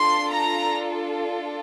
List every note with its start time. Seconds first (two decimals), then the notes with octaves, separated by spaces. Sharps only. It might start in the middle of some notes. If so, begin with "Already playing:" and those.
Already playing: D4 F4 A4 C6
0.32 A#5